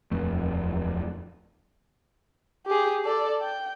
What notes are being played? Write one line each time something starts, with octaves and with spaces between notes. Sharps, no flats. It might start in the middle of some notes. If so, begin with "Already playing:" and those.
D#1 F2 A3
G4 G#4
A4 D5
G5